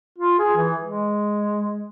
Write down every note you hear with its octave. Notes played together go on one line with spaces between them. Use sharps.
F4
G#4
E3
G#3